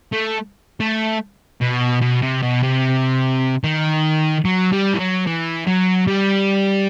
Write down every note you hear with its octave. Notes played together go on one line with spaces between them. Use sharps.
A3
A3
B2
B2
C3
B2
C3
D#3
F#3
G3
E3
F#3
E3
F#3
G3